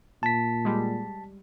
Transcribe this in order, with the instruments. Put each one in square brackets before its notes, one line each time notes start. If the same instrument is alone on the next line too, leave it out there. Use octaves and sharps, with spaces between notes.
[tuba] A#2 [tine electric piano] A5 B6
[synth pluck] G3 G#3